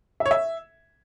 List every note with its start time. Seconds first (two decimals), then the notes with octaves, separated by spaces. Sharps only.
0.20 E5
0.26 C#5
0.31 E5